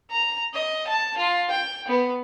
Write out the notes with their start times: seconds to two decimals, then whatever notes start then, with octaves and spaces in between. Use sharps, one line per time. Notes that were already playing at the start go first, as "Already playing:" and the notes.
0.11 A#5
0.54 D#5
0.87 A5
1.17 F4
1.50 G5
1.88 B3